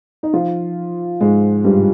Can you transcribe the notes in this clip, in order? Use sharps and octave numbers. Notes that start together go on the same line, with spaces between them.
D#4
F3 F4
G#2 G#3
G2 G3